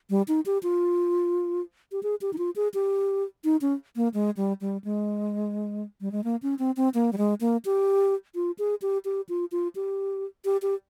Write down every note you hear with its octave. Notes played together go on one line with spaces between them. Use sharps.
G3
D#4
G4
F4
G4
G#4
G4
D#4
F4
G#4
G4
D#4
C#4
A#3
G#3
G3
G3
G#3
G3
G#3
A#3
C#4
C4
C4
A#3
G3
G#3
A#3
G4
F4
G#4
G4
G4
F4
F4
G4
G4
G4